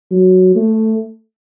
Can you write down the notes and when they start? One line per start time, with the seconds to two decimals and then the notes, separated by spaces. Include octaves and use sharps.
0.11 F#3
0.55 A3